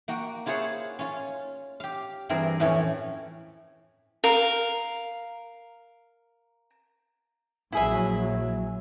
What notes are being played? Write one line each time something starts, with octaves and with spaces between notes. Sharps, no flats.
A#3 F#4 G5
E4 F4 G#4 C5 C#5 F#5
C#4 F4
G4 F5
G2 E3 C4 G#4 A#4
F2 A2 E3 C#4
A#4 F5
A#1 F#3 E4 G#4 E5